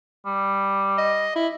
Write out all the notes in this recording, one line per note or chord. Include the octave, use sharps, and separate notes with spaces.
G3
D#5
E4